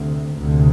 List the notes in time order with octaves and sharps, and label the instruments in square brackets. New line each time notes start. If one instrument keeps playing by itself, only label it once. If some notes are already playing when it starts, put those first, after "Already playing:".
Already playing: [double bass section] D2 C3
D2 C3